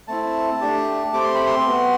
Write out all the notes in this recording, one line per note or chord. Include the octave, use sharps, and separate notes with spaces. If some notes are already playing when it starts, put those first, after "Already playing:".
A3 C4 E4 A5
A3 D4 G4
A3 C4 G4 D6
C6
B5
C6
B3 F#4